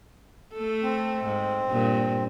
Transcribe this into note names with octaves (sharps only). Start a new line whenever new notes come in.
A3 A4
C4
G#2
G2 A#2